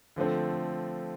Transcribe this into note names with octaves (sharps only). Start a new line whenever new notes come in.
D3 F3 A3 C4